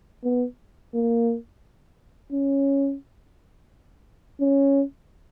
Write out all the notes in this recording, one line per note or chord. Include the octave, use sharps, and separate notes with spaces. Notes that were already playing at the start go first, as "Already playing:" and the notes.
B3
A#3
C#4
C#4